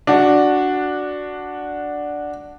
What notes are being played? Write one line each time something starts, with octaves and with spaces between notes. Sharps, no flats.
D4 F#4